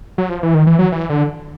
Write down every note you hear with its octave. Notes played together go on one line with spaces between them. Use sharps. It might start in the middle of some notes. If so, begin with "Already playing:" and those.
F#3
F3
E3
D#3
E3
F#3
E3
D3